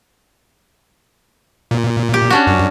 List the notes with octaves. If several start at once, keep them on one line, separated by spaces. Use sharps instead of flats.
A#2
G4
C#4 D4 F#4
F#2